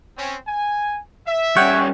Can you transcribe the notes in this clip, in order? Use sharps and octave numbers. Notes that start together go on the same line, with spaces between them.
C4 C#4
G#5
E5
G3 C#4 C#5 F#5 G5